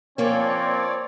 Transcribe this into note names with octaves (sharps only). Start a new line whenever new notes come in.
F3 A#3 C4 C#4 C#5 D5